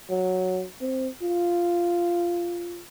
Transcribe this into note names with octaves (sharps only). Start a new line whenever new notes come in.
F#3
C4
F4